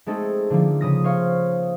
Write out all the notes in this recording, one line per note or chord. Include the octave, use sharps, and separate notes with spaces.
G#3 A3 C4 D#4 G#4 A4
D3 F3 A#3
C#3 D#6 A#6
C5 C#5 F5